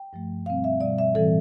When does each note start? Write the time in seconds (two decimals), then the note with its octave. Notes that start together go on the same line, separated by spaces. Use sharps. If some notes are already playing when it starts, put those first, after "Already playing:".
Already playing: G5
0.13 G2 F3 A3
0.46 B2 G3 C4 F5
0.64 E5
0.81 B2 G3 C4 D5
0.98 E5
1.14 A2 E3 G3 C4 A4